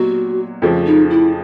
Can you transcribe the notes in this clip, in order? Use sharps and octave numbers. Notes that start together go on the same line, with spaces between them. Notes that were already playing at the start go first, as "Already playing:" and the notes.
Already playing: A#2 F#3 B3 D#4 F#4 G4
F2 C#3 F3 A3
D#4
E4